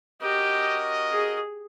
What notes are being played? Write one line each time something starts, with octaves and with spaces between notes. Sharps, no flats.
C#4 F#4 G4 A#4 D#5
G#4